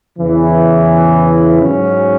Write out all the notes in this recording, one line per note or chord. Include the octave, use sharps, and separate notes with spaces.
E2 C#3 E3
G#2 F#3 C#4